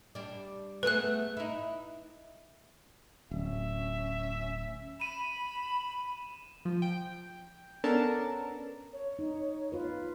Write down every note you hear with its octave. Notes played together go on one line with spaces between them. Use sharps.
G3 D4
A3 B3 G#4 B4 F#6
D#4 E4
D1 C#4 E5
B5 D#7 E7
F3
G5
B3 C#4 D4 A4 A#4 A5
C#5
D#4
F4 B4